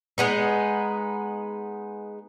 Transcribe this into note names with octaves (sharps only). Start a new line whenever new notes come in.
G#3 B3 D#4